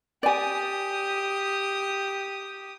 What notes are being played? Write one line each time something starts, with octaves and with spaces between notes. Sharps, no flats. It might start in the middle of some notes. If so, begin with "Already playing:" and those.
G4 D5 G#5 D#6